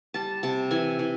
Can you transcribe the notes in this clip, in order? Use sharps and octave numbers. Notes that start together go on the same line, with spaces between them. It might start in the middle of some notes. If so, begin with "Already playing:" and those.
G3 A5
C3 A5
E3 G#5
E3